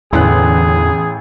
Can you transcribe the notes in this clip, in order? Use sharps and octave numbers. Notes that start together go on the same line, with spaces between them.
A1 E2 A2 D3 G#4 F#6